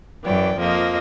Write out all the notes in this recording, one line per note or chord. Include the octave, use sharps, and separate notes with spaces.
F#2 E3 D5 G5
F2 F3 A#3 D#5